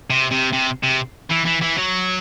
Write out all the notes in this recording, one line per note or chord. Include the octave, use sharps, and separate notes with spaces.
C3
C3
C3
C3
E3
E3
E3
F#3